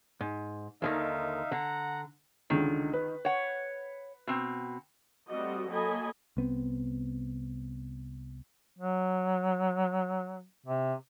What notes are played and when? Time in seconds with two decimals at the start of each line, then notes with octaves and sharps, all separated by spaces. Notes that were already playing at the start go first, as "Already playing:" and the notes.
0.21 G#2
0.82 D#2 D3 D#3 D#4 E5 F5
1.51 D3 F#5 A#5
2.50 C#2 D3 D#3
2.93 B4
3.25 C#5 F#5
4.27 B2 C4
5.28 G3 A3 C4 F#4 D#5
5.69 F#3 A#3 A4 D#5 G#5 B5
6.37 C2 B3 C4
8.78 F#3
10.66 C3